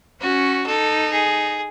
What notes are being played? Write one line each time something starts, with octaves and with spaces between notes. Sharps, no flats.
C#4 F#4
D#4 A4
G#4